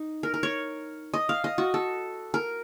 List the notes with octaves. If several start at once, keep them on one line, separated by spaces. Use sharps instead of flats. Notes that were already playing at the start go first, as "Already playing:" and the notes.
Already playing: D#4
A#4
A#4
C#5
D#5
F5
D#5
F#4
A4
A#4